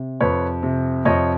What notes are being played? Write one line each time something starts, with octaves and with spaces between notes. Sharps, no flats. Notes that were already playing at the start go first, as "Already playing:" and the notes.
Already playing: C3
F2 B4 C#5
C3
F2 C#5 D#5